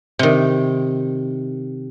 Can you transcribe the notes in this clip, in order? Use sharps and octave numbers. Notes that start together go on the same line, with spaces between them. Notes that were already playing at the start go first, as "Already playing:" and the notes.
C3 D#3